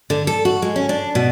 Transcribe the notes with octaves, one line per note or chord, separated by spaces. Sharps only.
D3
A4
F#4
G#3
C#4
D4
B2